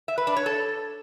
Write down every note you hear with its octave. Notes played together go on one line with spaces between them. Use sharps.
E5
B4
D4
C#5
A4